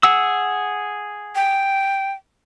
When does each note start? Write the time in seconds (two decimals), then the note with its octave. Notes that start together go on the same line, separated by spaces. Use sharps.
0.03 G#4 F#5 E6
1.35 G5